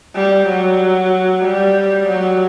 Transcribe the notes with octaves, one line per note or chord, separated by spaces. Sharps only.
G3
F#3
G3
F#3